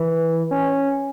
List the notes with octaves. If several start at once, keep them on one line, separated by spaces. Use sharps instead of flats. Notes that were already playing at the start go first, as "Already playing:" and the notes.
Already playing: E3
C#4